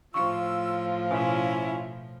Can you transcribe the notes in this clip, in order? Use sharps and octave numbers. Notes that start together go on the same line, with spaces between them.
A2 F3 F4 C#6 E6
B2 C#4 E4